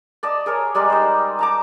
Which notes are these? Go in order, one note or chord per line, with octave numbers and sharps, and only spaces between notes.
D5 D#5 A5
G#4 A#4 C#5
G3 G#3 D5 A#5
D#4 C5
A5 A#5 D6